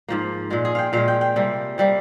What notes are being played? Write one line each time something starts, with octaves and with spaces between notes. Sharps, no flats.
G#2 F3 A#3
A#2 G#3 F4
G#4
F5 G5
A#2 G#3 F5
G5
G5
C3 G3 A#3
C3 G3 A#3